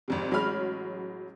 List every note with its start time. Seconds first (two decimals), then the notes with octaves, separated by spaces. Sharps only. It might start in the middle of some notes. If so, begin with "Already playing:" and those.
0.08 G#1 F2 C3
0.31 A1 F#3 G#3 C#5 B5 F6